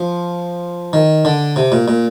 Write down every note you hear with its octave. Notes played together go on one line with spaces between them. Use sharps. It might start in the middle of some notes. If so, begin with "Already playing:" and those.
Already playing: F3
D#3
D3
C3
A#2
A#2